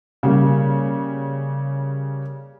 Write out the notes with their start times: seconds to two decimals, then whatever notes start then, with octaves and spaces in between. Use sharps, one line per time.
0.23 C#3 G3 A#3